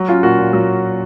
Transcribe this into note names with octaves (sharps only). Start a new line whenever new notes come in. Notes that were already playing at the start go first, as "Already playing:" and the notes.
Already playing: F#3
C#4 F4
A#2 F#4
A#2
F#3